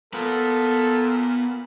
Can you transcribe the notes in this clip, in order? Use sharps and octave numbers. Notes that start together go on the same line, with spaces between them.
A#2 B3 A4 B4